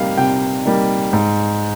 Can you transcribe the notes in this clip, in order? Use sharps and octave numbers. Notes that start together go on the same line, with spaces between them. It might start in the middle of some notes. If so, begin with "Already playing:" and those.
Already playing: C3 G3 A#3 D#4 F5
C3 G5
G3 A#3 D#4
G#2